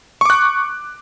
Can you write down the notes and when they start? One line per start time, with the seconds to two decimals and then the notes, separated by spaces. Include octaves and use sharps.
0.21 C#6
0.25 D6
0.30 F#6